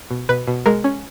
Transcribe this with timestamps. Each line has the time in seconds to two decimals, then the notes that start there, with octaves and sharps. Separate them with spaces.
0.11 B2
0.29 B2 B4
0.47 B2
0.66 G#3 A#4
0.84 C#4